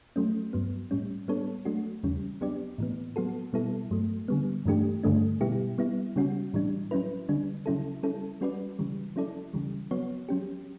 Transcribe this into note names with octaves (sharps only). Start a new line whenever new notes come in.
F#3 A3 C#4
G2 F#3 B3
A2 G3 C#4
G3 B3 D4 A4 C#5
F#3 A3 D4 F#4
E2 C#3 E3 G3 C#4
F#3 B3 D4 G4 D5
A2 E3 B3
F#3 B3 F#4 A4
B2 G3 B3 E4 A4
G2 F#3 A3
D3 G3 B3
G2 E3 A3 D4 G4
G2 D3 A3 D4
B2 G3 B3 E4 G4
G3 B3 E4
C#3 G3 C#4 F#4
A2 E3 G3 D4
F#3 C#4 E4 B4
D3 G3 D4
C#3 F#3 C#4 E4 A4
G3 C#4 E4 A4
G3 C#4 F#4 B4 D5
C#3 E3 G3
F#3 C#4 E4 A4 D5
C#3 E3 G3
F#3 B3 F#4 C#5
F#3 C#4 G4